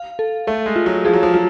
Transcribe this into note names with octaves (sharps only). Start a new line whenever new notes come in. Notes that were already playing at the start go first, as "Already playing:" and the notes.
Already playing: F5
A4
A3 A4
G#3
F4
F#3
F3 G#4
F#3
F3
F#3 F4